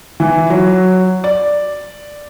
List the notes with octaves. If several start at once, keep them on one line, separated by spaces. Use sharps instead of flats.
E3
F#3
D5